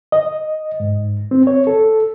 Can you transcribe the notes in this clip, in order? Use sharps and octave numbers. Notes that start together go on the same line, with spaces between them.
D#5
G#2
C4
C#5
A4